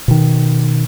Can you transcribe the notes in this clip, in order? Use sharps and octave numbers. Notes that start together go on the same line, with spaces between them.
B2 D#3